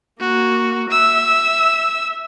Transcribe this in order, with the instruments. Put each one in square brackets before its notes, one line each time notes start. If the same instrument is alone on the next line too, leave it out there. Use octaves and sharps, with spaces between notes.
[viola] A#3 [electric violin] F#4
[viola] E5 [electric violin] E6